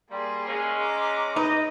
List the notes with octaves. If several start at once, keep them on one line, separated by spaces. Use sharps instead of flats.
G3 A#3 G#4 C6
G#3 C#4
A#5 D6
D#4 B4 D#5